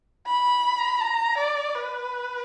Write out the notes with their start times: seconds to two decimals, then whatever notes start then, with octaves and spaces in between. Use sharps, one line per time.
0.27 B5
1.01 A#5
1.38 D5
1.75 B4